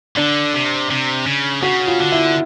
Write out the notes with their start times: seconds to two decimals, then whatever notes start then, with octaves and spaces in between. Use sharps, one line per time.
0.17 D3 D4
0.54 C3
0.90 C3
1.26 C#3
1.62 C#3 F#4
1.87 F4
2.00 D3
2.12 E4